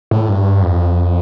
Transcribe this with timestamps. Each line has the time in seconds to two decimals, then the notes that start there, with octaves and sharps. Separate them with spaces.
0.11 A2
0.28 G2
0.62 F2